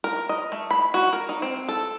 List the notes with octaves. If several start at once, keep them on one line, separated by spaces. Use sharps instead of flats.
A#4
D#5
A3
B5
F#4
A#4
D#4
C4
A4